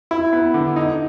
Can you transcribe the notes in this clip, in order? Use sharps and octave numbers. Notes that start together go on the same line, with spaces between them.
E4
B3
D3
D#4